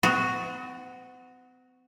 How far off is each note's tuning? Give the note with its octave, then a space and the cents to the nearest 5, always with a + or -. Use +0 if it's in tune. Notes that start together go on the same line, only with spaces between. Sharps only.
C4 -45 F#4 +0 D#5 +0